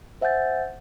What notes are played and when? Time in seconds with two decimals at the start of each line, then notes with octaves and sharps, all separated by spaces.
0.21 C5 E5 F#5 G#5 G6 A6